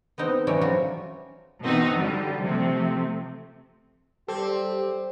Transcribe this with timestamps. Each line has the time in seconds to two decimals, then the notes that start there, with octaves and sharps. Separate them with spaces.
0.18 B3 C4 D#4 A#4
0.47 E3 G3 C#4 A4 A#4
0.61 F3 F#3 A3 F4 F#4
1.62 B2 E3 C4 D#4 F#4
1.92 D3 G3
2.42 C3 F3 A3 C4
4.28 G3 C4 G4 A4